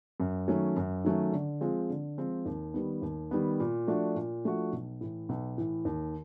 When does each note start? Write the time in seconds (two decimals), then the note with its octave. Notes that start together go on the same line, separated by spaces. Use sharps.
0.20 F#2
0.48 D#3 F#3 A3 C#4
0.76 F#2
1.04 D#3 F#3 A3 C#4
1.32 D3
1.61 F3 G#3 C4 F4
1.90 D3
2.18 F3 G#3 C4 F4
2.46 D#2
2.74 D#3 G3 B3
3.02 D#2
3.31 D#3 G3 B3
3.60 A#2
3.87 F3 A3 D4 F#4
4.15 A#2
4.45 F3 A3 D4 F#4
4.73 B1
5.01 A2 E3
5.29 B1
5.58 A2 E3
5.85 D#2